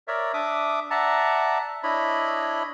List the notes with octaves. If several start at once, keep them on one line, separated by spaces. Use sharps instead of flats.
A#4 C#5 D5 E5
D4 E5 D6 D#6
D5 E5 F#5 A5 A#5
D4 E4 C#5 D#5 B5